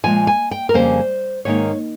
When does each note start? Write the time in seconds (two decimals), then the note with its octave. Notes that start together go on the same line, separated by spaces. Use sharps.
0.04 A#2 F3 G#3 G#5
0.27 G#5
0.51 G5
0.69 A#4
0.74 F2 C#3 G3 A#3 C#4 C5
1.45 G#2 D#3 A#3 D#4 C#5